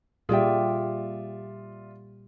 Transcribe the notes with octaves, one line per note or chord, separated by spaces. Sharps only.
A#2 G3 F4 G4 G#4 D5 E5 G5